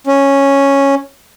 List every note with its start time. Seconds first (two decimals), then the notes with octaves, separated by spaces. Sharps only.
0.07 C#4